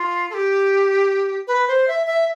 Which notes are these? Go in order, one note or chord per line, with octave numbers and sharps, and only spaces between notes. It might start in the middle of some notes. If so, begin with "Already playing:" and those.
Already playing: F4
A4
G4
B4
C5
E5
E5